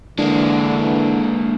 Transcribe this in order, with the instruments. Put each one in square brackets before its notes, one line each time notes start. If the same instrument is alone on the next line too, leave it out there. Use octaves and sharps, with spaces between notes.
[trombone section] D3 E3 [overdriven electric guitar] G#3 A#3 [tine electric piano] D4